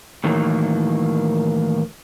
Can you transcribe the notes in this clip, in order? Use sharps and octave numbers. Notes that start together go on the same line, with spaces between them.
A2 D#3 E3 F#3 A#3